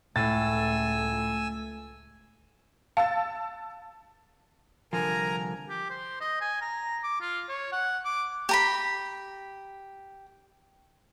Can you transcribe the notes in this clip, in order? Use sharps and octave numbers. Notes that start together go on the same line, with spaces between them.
C#2 A2 A3 G#5 E6 A6
F5 A5 E6 A6
C2 D3 F3 A#4 G#5 A#5
G4
C5
D#5
G#5
A#5
D6
F4
C#5
F#5
D6
G4 A#5 B5